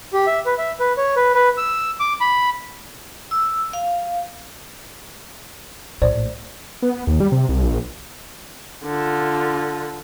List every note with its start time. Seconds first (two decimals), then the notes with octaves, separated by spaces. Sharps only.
0.13 G4
0.27 E5
0.46 B4
0.58 E5
0.80 B4
0.97 C#5
1.16 B4
1.35 B4
1.57 E6
2.00 D6
2.21 B5
3.31 E6
3.73 F5
6.02 A#1 A2 C5 D5
6.82 B3
7.07 D#2
7.20 G3
7.32 C3
7.49 C2
7.63 A#1
8.85 D3 F4